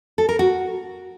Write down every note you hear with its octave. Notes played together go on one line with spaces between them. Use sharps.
A4
A#4
F#4